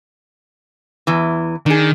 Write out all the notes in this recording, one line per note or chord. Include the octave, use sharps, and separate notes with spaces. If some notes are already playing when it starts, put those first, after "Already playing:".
E2 E3
D#3 D4 G#4